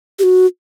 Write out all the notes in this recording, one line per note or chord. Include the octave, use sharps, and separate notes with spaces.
G4
F#4